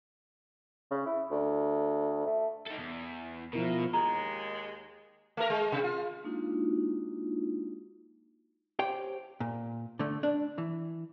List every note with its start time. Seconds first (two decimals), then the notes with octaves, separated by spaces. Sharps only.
0.91 C#3
1.06 E4
1.31 D2
2.26 A3
2.67 D#4 A4
2.79 E2
3.53 B2 F3 E4 A#4
3.93 D#2 G#3 A#5
5.37 A3 A#4
5.50 G#3
5.72 C3
5.84 F4
6.24 G#3 A#3 D4 D#4 F4 F#4
8.79 G4 C5 C#5 G5
9.40 A#2
9.99 D3 A3
10.23 D4
10.58 E3